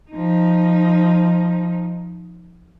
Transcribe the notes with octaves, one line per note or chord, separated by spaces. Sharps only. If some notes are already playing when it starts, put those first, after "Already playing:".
F3 D#4